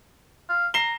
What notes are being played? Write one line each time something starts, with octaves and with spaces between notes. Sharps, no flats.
F5
A#5 C7 E7 G7